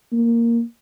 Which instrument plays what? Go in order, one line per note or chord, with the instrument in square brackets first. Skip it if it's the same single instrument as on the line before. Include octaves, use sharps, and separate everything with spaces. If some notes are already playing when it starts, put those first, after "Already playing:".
[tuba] A#3